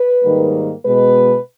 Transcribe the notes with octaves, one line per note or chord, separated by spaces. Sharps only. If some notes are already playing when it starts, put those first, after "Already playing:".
Already playing: B4
G#2 D#3 G3 A#3
B2 G#3 B4